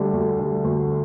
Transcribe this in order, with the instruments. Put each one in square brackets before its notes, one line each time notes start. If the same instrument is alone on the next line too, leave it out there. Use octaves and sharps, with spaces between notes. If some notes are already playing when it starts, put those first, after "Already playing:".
Already playing: [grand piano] D2 D3 G3
D2
D3 G3
D2